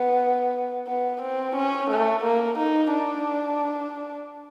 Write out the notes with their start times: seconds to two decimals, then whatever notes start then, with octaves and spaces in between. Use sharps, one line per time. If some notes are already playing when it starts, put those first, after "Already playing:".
Already playing: B3
0.87 B3
1.21 C4
1.56 C#4
1.90 A3
2.24 A#3
2.58 D#4
2.92 D4